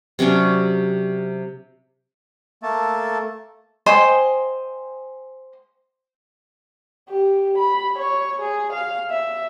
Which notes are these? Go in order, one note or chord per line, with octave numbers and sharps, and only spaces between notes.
C3 F#3 C#4 D4
A3 A#3 A4
C5 D#5 G5 G#5
G4
B5
C#5
G#4
F5
E5